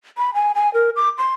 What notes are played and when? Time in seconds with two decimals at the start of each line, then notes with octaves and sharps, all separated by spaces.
0.18 B5
0.34 G#5
0.55 G#5
0.74 A#4
0.96 D6
1.18 C6